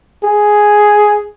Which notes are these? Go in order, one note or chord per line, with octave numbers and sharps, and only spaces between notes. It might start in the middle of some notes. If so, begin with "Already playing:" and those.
G#4